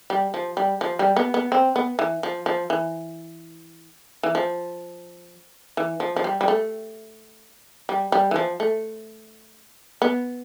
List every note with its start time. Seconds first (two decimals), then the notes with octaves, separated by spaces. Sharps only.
0.10 G3
0.34 F3
0.57 G3
0.81 F3
0.99 G3
1.17 B3
1.34 B3
1.52 C4
1.76 B3
1.99 E3
2.23 F3
2.46 F3
2.70 E3
4.23 E3
4.35 F3
5.77 E3
6.00 F3
6.16 F3
6.24 G3
6.41 G3
6.48 A3
7.89 G3
8.12 G3
8.31 E3
8.36 F3
8.60 A3
10.02 B3